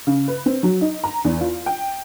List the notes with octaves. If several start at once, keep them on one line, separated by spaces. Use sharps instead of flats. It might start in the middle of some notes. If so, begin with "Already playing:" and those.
C#3
B4
C4
F#3
D#4
A#5
E2
F4
G5